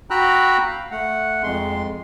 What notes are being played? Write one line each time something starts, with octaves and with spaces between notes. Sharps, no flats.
F#4 G5 A#5 B5 E6 F#6
F5
A3 F#5
F2 G#3 C6